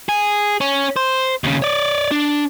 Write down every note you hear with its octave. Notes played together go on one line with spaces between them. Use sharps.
G#4
C#4
C5
D#2 C#3
C#5 D5
D4